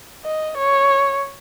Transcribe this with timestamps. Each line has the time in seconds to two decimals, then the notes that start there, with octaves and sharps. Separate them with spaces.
0.25 D#5
0.57 C#5